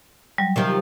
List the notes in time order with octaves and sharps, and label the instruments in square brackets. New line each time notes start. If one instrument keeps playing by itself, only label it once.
[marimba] F#3 G3
[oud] C3 D#3 F3